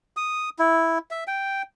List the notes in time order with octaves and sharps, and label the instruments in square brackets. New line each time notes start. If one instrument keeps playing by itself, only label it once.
[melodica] D#6
E4
E5
G5